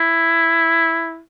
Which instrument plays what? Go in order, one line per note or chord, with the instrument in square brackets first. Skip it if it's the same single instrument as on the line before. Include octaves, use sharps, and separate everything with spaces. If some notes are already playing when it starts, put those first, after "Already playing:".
Already playing: [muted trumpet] E4